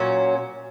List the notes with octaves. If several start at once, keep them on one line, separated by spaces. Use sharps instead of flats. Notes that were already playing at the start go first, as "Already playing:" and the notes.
Already playing: A#2 F#3 C#4